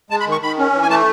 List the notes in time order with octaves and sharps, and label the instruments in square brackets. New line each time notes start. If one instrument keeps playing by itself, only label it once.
[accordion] G#3 A5
B5
D#3
C#6
D#3 B5
C#4
E3
G#5
A3 A5